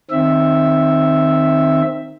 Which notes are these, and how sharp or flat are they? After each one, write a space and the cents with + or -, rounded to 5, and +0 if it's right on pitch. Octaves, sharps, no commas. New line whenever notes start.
D#3 -10 C4 +5 E5 +0